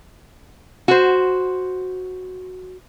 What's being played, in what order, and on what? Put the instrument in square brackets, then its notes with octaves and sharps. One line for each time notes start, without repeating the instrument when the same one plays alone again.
[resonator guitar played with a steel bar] F#4 C5